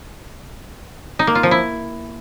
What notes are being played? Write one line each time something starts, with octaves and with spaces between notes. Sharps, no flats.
D#4
A#3
F4
F3
E4